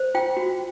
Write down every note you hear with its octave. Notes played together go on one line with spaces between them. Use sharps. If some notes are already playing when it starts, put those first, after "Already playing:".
Already playing: C5
F4 G5
F#4